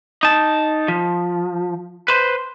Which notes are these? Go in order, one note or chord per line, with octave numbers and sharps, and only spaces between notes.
D#4 A5
F3
B4 C5